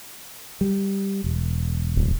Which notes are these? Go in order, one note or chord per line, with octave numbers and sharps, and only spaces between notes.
G3
E1
D1